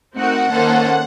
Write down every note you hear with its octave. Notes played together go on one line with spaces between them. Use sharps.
A3 C4 D#4 F#4 A#4 F#5
D#3 A#3 C#4 A4 C5